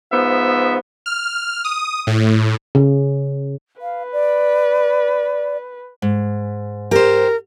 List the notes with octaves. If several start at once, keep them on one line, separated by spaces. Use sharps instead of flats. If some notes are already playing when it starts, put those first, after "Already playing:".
G#2 F3 B3 E5
F6
D#6
A2
C#3
B4 F5
D5
G#2
G4 A#4 C5